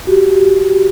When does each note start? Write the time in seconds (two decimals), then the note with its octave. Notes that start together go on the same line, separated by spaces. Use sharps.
0.07 F#4 G4